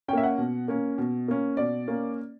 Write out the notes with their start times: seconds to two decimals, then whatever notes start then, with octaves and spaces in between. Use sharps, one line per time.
0.08 C#4 G5
0.13 A#3 E5
0.23 F#5
0.38 B2
0.68 A#3 C#4
0.98 B2
1.28 A#3 C#4
1.57 B2 D5
1.88 A#3 C#4